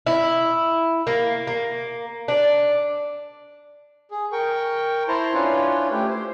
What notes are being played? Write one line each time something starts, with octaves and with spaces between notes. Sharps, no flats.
E4
A#3
A#3
D4
G#4
A#4 G5 C#6
E4 C5 A5 A#5 C6
C#4 D4 E4 F4 B4 C#5
A3 G4
C5